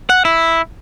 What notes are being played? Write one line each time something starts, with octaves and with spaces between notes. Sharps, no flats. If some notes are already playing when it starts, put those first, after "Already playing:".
F#5
E4